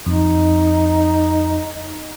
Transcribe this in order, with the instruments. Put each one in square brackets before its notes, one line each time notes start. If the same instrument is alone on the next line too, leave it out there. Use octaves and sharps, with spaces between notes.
[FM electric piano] F2 [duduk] D#4